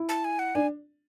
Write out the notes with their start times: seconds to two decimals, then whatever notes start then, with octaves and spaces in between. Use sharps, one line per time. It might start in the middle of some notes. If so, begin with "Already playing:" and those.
Already playing: E4
0.09 A5
0.24 G#5
0.39 F#5
0.55 D4 G#5